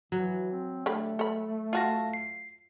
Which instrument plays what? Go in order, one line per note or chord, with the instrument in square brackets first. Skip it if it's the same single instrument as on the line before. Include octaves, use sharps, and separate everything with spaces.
[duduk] E3 [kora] F#3
[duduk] C4
[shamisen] D3 G4 B5 [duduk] A3
[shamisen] A4 B5
[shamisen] F4 F#4 [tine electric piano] F5 A5 A#6
[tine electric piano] C7